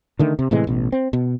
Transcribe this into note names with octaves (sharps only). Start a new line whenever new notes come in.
D3 D#3 A3
C3
A2 C3 E3 G#3
A1 B2
C4
B2